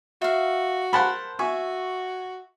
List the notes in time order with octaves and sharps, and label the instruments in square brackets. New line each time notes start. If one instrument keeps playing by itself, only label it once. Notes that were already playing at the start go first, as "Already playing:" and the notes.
[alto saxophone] F#4 [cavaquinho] E5 F5
[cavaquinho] A#4 C5 [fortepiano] F#5 A5 B5
[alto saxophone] F#4 [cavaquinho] E5 [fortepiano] G#5 C#6